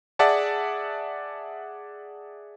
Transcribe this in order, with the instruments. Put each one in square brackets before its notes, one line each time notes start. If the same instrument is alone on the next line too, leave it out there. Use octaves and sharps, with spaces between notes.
[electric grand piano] G#4 D5 E5 F#5 A5